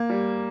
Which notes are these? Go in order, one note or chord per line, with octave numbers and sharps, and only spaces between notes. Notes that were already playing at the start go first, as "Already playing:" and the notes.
Already playing: A#3
G3